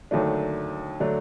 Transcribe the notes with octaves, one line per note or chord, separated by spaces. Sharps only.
D#2 D3 F#3 A3 D4
D3 F#3 A3 D4